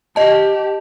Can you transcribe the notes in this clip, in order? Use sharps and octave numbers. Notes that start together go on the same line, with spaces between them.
G4 D#5 A5